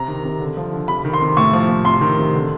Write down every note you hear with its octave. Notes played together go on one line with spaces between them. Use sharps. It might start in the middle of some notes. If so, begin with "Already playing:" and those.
Already playing: C3 A#5
D#3
C3
D3
F3
D3
C3 B5
D#3
C6
C3
A2 C#6
F3
A2
C3 C6
D#3
C3
D3